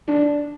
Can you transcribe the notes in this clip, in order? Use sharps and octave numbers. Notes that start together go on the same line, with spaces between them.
D4